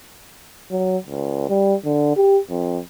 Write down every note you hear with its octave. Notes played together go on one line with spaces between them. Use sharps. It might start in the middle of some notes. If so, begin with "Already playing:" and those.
F#3
C#2
G3
D3
G4
F2